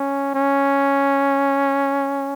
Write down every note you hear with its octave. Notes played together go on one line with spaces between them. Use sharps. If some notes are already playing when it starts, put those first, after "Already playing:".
Already playing: C#4
C#4